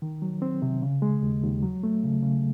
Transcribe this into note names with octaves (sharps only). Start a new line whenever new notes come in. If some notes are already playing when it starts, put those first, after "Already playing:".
D#3
F#3
C4
C3
C#3
G#3
D#2
D#2
F#3
A3
C#3
C#3